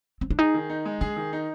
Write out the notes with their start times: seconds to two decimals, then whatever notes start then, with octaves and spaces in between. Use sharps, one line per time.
0.21 C4
0.30 D4
0.38 D#4 G#4
0.54 D#3
0.69 D#4
0.85 G#3
1.01 D4 G#4
1.16 D#3
1.33 D#4